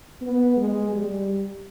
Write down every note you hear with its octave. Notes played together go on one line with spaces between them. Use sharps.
B3
G#3
G3